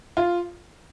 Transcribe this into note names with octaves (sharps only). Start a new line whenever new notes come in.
F4